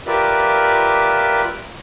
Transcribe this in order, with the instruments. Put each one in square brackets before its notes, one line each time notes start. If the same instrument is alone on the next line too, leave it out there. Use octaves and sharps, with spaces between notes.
[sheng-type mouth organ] F4 G4 A#4 B4 D5 E5